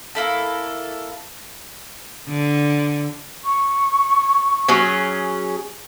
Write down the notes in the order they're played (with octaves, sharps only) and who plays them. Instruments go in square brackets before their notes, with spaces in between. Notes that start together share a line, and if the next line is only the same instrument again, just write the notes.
[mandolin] A#3 E4 A4
[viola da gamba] D3
[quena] C#6
[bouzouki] F#3 C#4 G#4